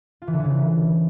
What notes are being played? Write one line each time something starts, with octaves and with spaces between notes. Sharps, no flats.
F4
E3
D3
E3
C#3